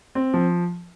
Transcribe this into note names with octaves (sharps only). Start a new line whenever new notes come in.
C4
F3